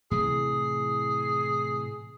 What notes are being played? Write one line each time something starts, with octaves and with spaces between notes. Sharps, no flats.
A2 C3 E3 G#4